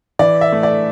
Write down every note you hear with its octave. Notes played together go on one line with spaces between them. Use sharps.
E3 D5
E5
A3
D5